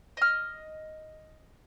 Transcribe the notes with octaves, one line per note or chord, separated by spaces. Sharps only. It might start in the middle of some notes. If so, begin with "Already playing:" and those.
D#5 F6